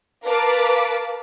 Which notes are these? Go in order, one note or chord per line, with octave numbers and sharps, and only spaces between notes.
A#4 B4 F5 A5 D6